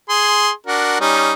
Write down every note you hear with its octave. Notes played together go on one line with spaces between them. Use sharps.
G#4 C6
D4 F#4 A#4
G3 C#4 D#4